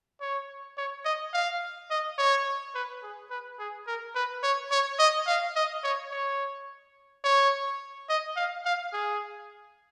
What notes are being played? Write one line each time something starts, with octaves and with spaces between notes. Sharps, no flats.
C#5
C#5
D#5
F5
D#5
C#5
B4
G#4
B4
G#4
A#4
B4
C#5
C#5
D#5
F5
D#5
C#5
C#5
C#5
D#5
F5
F5
G#4